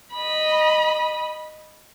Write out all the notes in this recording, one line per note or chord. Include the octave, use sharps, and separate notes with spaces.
D#5 B5